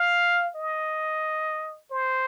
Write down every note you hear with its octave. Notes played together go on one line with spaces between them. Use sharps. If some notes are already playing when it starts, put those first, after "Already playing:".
Already playing: F5
D#5
C5